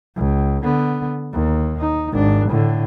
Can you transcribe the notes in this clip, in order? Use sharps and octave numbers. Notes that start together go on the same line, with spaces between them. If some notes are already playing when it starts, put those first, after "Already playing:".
C#2
D3 B3
D#2
D#4
G#1 D4
A2 D3